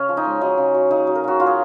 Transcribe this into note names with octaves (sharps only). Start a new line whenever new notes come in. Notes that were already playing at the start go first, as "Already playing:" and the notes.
Already playing: C#3 C#4
F3
D#4
G#3
F#3 D#4
C#3
F#3
C#3 D#4
F#3
A#4
C#3 F#4
F#3 F4
G#4